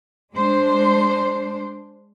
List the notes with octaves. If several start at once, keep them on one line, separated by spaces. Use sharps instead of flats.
G#3 D4 C5